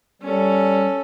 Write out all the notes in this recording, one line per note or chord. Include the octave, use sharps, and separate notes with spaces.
G3 C#4 A4